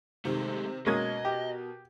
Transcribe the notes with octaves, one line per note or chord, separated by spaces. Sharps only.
C3 D#3 G#3 A3
B2 G#3 A#3 C#4 A#4 D#5 G#6
G4